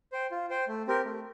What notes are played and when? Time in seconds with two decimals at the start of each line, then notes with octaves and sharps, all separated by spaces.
0.12 C5 G5
0.31 F4
0.50 C5 G5
0.68 A3
0.87 C4 G4 A#4
1.05 A3